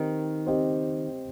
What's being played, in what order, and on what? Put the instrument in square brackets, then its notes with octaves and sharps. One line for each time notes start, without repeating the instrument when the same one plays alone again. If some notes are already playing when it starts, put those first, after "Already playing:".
Already playing: [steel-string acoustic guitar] D#3 [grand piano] C4 G4 C5 D#5
[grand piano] C4 G4 C5 D#5